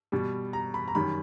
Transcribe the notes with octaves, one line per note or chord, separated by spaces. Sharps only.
B2 G3
A#5
B5
A#5
F#2 D#3 G3 B5